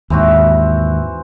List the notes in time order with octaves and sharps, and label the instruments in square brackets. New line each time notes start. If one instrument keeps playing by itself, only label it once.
[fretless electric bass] D#2 G#2 [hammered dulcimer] E3 C4 F#4